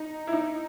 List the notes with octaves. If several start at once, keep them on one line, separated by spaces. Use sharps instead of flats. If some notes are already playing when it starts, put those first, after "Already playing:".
Already playing: D#4
E4
D#4